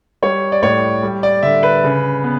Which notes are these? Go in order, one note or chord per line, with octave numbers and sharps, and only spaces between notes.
G3 C#5
D5
A2 C#5
G3
D5
D3 E5
B4
C#3
B3